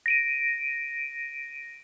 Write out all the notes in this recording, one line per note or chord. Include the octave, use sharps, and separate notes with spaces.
A#6 D7 D#7